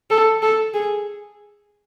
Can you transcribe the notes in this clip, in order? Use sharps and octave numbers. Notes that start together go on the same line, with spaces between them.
A4
A4
G#4